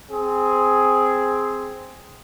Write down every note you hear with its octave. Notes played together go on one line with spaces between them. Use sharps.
C4 G#4